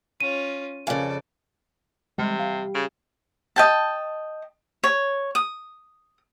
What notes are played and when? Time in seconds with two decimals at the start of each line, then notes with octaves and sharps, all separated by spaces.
0.20 C#4 F4 D#7
0.87 F2 C#3 A4 A#4 D5 F5 G#5
2.18 C3 G3 G#3
2.40 F5
2.74 C#3 D7
3.56 D#5 G5 A5
4.84 C#5
5.35 D#6